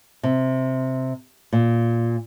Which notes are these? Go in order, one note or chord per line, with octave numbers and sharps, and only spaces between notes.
C3
A#2